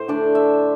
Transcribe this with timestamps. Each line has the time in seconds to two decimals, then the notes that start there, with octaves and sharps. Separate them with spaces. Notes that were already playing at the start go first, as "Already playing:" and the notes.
Already playing: A2 C5
0.08 D3 A3 D4 D5
0.35 E5